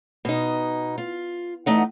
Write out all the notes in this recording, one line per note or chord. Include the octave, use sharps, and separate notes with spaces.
B2 D#4
F4
E2 A3 D#4 F#5